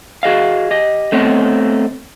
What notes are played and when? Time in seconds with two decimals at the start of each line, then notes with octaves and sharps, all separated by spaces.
0.23 F#4 G#4 D#5 F5
0.71 G4 D#5
1.12 A3 B3 C4 C#5 D#5